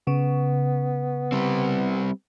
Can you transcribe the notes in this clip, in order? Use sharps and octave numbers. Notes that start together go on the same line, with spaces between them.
C#3 B3
G3 C4